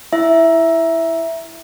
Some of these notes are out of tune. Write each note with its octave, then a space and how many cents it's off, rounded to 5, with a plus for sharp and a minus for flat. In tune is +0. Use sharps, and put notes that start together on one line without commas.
E4 +0 E5 +0